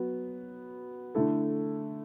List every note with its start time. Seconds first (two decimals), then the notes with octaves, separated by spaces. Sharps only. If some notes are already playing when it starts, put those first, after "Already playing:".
Already playing: F#3 B3 F#4
1.15 D3 A3 E4 A4